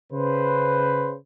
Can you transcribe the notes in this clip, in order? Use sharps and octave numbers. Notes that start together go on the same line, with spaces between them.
C#3 B4 C5